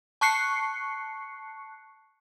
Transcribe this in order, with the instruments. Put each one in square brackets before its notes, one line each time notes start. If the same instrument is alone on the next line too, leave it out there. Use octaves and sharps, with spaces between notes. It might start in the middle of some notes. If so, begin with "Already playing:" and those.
[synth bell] A5 C#6 F#6 C7 C#7